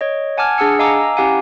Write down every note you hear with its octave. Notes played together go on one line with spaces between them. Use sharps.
C#5 D#5
F#5 G#5 A5 D6 F6 G#6
D4 G#4 F#5 A5 E6 C#7
D#5 F5 G#5 A#5 D6 E6
A#5
C#4 E4 G4 F5 F#5 G#5